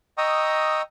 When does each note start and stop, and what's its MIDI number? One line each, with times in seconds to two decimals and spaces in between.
0.18 0.82 75
0.18 0.82 79
0.18 0.82 82
0.18 0.82 85
0.18 0.82 87
0.18 0.82 88